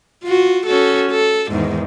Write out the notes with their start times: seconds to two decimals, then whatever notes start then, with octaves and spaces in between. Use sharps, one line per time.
0.24 F4 F#4
0.66 C#4 F#4 A4
1.11 A4
1.51 E2 G#2 D#3